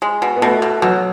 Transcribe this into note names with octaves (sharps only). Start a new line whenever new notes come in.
G#3
B2
B3
B2 A3
B2
B2 F#3